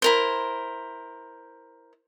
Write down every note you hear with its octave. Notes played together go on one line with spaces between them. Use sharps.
E4 A#4 C5